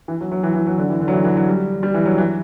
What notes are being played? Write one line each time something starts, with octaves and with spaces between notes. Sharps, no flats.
E3
F#3
F#3
E3
E3
F#3
D3
E3
D3
F#3
E3
E3
F#3
G3
G3
E3
F#3
E3